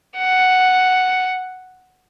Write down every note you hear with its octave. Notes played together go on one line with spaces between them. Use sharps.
F#5